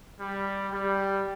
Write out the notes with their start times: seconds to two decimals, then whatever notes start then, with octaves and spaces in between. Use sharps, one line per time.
0.20 G3
0.72 G3